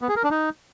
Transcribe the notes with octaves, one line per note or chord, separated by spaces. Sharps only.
B3
G#4
A#4
D4
D#4